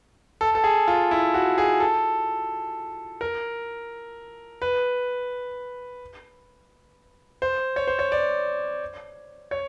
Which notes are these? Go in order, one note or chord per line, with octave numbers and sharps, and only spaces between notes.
A4
A4
G#4
F4
E4
F#4
G#4
A4
A#4
B4
C5
C#5
C5
C#5
D5
C#5